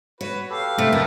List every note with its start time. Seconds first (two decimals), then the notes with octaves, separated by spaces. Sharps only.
0.21 F#4 B4 C#5
0.50 G4 A4 B4 F5
0.78 C3 A3
0.93 F2 A#4